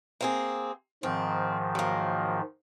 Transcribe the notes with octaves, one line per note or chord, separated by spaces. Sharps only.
A#3 C4 G#4
G#2 D#3 F3 C4
F#3 A#3